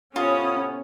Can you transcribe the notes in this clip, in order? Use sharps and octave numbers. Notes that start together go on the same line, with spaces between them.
A2 C3 B3 C#4 F4 B5 D#6